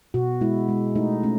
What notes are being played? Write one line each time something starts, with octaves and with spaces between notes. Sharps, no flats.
B2 F#4
G#3 E4
G#3
A3 D#4
A3 C#4